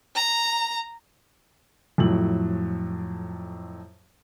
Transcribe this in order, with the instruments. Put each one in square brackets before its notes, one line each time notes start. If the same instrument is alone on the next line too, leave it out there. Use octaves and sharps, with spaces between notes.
[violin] A#5
[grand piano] F2 A2 F#3 F#7